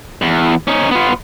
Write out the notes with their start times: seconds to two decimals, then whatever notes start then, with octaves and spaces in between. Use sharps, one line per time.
0.22 E2
0.68 C#4 D#4
0.91 B3 F4